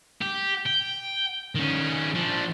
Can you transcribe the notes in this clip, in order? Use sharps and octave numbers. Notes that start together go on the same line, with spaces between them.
G4
G5
D#3 C#4
F3 D4